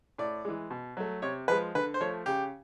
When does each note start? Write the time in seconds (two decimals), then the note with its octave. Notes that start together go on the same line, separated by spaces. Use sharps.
0.18 A2 D5
0.45 E3 G#3
0.70 B2
0.97 F#3 A3
1.22 C3 C#5
1.48 F3 G#3 B4
1.75 D3 B4
1.94 C5
2.01 F3 A3 C#5
2.26 C#3 G4